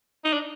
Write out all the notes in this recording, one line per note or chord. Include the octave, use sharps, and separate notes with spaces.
D#4
D4